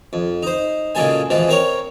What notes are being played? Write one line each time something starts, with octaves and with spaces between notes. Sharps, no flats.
F2
D#4 C5
A#2 C#3 F#3 G#3 A4 G#5
B2 E3 F3 G#3
C4 A#4 C#5